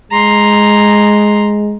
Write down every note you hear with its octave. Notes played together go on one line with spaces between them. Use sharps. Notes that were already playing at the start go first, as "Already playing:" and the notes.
G#3 A#5 C6